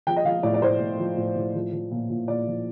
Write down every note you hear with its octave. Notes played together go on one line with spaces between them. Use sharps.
F3 G5
D#5
F3 F5
A2 D5
D5
A2 C5
A2
F3
A2
A2
F3
F3
A#2
A#2
A#2 D5
F3